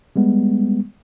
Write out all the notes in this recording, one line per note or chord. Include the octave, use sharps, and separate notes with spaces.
G3 G#3 B3